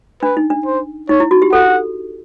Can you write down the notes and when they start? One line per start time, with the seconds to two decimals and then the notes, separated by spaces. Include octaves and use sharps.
0.23 D4 B4
0.37 D#4
0.50 D4
0.66 C5
1.09 D#4 C#5
1.20 E4
1.31 F#4
1.42 G4
1.52 A4 F#5